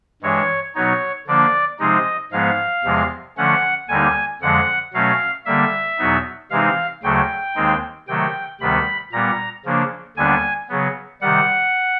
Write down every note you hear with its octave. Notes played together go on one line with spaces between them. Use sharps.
G2 E3 G#3 C#5
B2 F#3 B3 D#4 C#5
D3 F3 A#3 D4 D5
C3 F3 G#3 C4 D#4 D#5
G#2 F3 G#3 B3 F5
E2 C3 F3 G#3
D3 F3 A3 C#4 F#5
D#2 D3 G3 A#3 D#4 G#5
F2 D3 F3 G#3 F#5
B2 F#3 A3 C#4 F5
D3 G3 A#3 E5
E2 B2 F#3 B3 D#4
C3 E3 G#3 C4 D#4 F5
D2 C#3 F#3 A3 G5
D#2 D#3 G#3 C4 D#4
C3 D#3 F#3 A3 G5
D2 C3 D#3 G3 B3 B5
A#2 G3 B3 A#5
C#3 F3 A#3 D4
D#2 D3 G3 B3 D4 G#5
C#3 F#3 B3
C3 D#3 G3 F#5